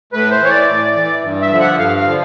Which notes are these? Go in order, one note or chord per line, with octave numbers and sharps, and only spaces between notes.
A2 B4
C5
E3 C#5
D5
A2
E3
G2
E5
D3 F3
F#5
G2 F5
F5
D3 F3